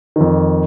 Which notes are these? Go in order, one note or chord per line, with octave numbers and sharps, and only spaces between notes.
F2 D#3